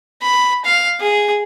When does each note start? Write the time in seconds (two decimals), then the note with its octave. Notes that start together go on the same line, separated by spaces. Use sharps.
0.22 B5
0.65 F5
1.00 G#4